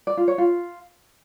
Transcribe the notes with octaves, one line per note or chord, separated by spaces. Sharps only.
D5
F4
C#5
F4